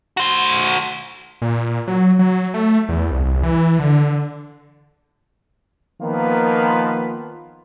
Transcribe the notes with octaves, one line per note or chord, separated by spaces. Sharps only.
F#4 C5
A#2
F#3
F#3
A3
E2
C2
E3
D3
D#3 F3 A#3 B3 F4 B4